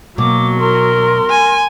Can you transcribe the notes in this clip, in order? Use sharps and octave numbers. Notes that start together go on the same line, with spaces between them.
B2 F#3 A#3 D6
A#4 C6
G#5